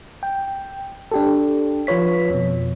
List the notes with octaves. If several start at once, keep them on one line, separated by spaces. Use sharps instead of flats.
G5
D4 G4 A4
F3 F4 B4 C#5 B6
F2 B2